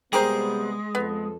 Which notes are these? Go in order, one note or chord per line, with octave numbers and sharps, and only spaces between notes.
C3 G3 G#3 B3 G4 G#4 A#4 C5
F2 B3 A4